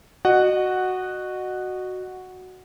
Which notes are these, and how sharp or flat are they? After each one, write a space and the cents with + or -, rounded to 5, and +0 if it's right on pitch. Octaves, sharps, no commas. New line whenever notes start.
F#4 +0 D#5 -30 F#5 +0